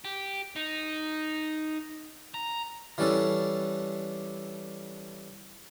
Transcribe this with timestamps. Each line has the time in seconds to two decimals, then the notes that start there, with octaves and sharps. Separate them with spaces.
0.05 G4
0.56 D#4
2.34 A#5
2.98 E3 G3 C#4 D4 A4